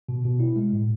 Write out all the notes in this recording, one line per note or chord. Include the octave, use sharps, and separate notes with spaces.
B2
B2
E4
G#3
A2